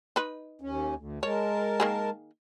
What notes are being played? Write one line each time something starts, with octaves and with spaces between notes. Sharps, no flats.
D#4 B4
D#2 C#4
D2
G#3 A#4 C#5 A5
D#3 A#3 G#4